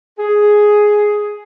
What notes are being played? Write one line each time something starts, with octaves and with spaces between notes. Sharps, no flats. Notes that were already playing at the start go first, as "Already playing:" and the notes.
G#4